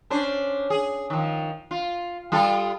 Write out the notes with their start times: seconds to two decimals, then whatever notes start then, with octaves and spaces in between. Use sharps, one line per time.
0.10 C#4 D4 C5
0.70 G#4
1.10 D#3 F3
1.71 F4
2.32 G3 F4 A4